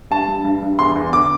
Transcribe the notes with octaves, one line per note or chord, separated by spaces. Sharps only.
G2 A5
G2
G2
G2
E2 C6
E2
D3 D6